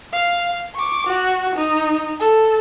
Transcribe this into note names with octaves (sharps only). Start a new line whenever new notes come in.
F5
C#6 D6
F#4
D#4
A4